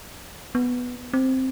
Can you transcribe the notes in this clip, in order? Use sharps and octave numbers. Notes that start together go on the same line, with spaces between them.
B3
C4